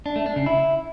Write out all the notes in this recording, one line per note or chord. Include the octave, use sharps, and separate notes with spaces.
D4
A3
D4
C#3
E4